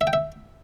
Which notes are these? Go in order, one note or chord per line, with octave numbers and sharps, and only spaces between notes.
E5
G5
E5